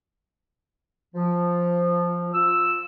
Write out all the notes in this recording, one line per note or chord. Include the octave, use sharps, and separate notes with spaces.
F3
F4 E6